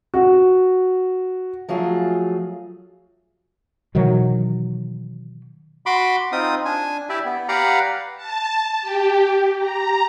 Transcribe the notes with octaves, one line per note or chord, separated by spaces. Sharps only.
F#4
F3 F#3 A3 F4 G#4
B2 D#3 E3 F#3
F#4 B5 C6 D6
C4 D#4 F4 D#6
D4 G#5
E4 G4 D5 E5
B3
G4 B4 D5 F5 F#5 A#5
A5
G4
A#5